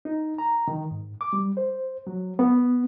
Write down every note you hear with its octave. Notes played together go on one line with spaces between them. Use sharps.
D#4
A#5
D#3
G#2
D6
G3
C5
F#3
B3